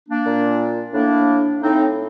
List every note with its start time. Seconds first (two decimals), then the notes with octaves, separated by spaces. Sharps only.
0.09 A#3 D4
0.26 A#2
0.93 A2 A#3 D4
1.62 A2 C4 D#4